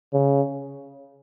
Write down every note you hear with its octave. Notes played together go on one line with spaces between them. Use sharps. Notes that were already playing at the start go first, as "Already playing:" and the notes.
C#3